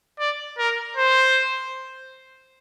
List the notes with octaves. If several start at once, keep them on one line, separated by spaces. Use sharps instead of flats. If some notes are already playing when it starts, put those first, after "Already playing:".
D5
A#4
C5